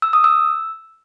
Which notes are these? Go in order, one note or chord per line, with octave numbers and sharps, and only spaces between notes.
E6
D#6
E6